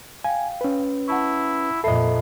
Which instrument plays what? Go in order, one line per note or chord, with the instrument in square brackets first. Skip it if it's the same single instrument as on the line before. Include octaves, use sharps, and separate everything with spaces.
[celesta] F5 G5 [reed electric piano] G#5
[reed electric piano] C#4 B4
[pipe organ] E4 [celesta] F#5 A5 C#6
[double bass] F2 A#2 [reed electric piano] A4 D#5 [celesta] E5 B5 C7